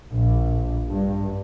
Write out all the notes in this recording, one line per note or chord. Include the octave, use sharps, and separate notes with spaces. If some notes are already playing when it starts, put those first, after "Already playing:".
A#1
G2